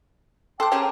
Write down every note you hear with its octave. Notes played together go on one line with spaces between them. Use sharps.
A4 C5 G5 A5 D6 F#6
C4 C#4 G4 G#4 A#4